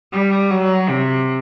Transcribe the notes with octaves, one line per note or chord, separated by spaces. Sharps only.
G3
F#3
C3